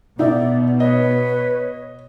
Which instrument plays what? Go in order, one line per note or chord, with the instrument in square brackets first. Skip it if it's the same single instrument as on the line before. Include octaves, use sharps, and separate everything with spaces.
[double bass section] B2 [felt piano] D#4 E5 [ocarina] D5
[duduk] B4 [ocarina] C#5 [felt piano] D#5